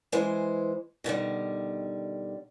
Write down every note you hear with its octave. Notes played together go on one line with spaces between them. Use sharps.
E3 G#3 C5
B2 D3 D#3 G3